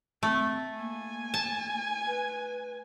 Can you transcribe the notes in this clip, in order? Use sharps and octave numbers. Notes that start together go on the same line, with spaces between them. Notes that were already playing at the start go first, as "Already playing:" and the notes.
A3 C4
A#3 G#5
A5
B4